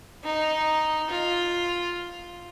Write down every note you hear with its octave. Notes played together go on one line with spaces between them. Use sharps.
D#4
F4